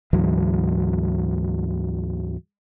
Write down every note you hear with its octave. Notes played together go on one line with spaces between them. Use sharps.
D2 G#2 E3 F#3